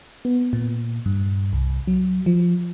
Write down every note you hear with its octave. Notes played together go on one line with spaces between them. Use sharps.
B3
A#2
G2
C2
F#3
F3